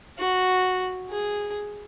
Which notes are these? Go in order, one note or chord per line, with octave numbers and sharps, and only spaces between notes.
F#4
G#4